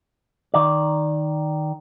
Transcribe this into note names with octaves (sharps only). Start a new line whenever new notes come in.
D#3 D5